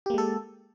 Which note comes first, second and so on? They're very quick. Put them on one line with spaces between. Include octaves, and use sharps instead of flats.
G4 A#3 G#3 A4